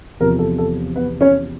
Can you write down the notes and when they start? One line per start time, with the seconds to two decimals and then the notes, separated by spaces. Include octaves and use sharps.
0.20 E2 C3 F3 A#4
0.39 A4
0.58 A4
0.96 B3 B4
1.21 C#4 C#5